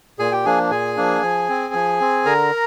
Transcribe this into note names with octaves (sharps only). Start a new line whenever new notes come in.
A#2 G#4 G#5
G4 G5
F3 A#3 D4 G#4 G#5
A#2 G#4 G#5
F3 A#3 D4
F3
C4
F3
C4
D3 A#4 A#5